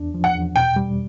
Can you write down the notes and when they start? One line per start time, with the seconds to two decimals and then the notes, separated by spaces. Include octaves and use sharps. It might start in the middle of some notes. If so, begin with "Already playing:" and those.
Already playing: E2 D4
0.14 F3
0.24 F#5
0.35 E2
0.56 B2 G5
0.76 G3